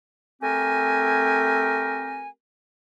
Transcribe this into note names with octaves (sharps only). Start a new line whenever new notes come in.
A3 C4 G4 A#4 G#5